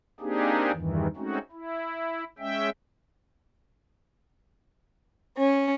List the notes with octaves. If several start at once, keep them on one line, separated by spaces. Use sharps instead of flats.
A#3 C4 D4 D#4 G4 G#4
E2 G2 D#3 E3
G#3 A3 C4 C#4 D#4 F#4
E4
G#3 C#4 E5 G5
C#4